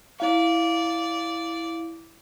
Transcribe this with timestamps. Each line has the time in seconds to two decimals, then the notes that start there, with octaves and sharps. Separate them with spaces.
0.20 E4 D5 F5